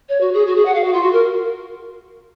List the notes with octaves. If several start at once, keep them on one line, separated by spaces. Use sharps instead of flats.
C#5
F#4
G#4
F#4
G#4
F#5
F5
F#4
F4
F#4
A#4